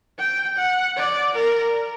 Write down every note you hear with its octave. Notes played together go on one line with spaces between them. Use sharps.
G5
F#5
D5
A#4